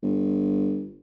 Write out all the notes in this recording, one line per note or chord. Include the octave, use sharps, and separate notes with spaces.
G1